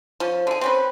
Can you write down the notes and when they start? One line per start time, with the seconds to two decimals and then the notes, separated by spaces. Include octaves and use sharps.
0.20 F3 C#4
0.47 D3 G#4
0.61 C4 C#4 B4